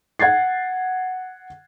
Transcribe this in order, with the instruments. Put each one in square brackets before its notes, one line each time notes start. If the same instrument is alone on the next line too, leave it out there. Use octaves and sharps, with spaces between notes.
[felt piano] F#5 G#6 A6 C7